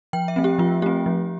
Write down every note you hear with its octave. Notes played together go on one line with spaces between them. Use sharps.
F3 G5
E5
A3 C4
G4
F3 F4
A3 C4 G4
F3